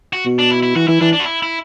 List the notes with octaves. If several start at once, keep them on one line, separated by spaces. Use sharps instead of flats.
F#4
B2
D4
E4
E4
E3 F#4
E3 E4
E3 D4
D4
F#4
E4
E4